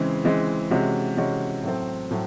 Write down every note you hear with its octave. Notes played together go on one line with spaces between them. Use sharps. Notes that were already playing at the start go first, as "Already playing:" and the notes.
Already playing: C#3 E3 G#3 C4
C#3 E3 G#3 C4
C3 E3 G#3 C#4 F#4
C3 E3 G#3 C#4 F#4
A2 F#3 A3 C4
A2 F#3 A3